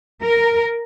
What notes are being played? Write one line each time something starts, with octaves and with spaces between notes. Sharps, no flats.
A#4